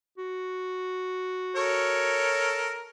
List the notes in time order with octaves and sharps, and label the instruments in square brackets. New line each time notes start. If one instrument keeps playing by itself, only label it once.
[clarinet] F#4
[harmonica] A4 A#4 C#5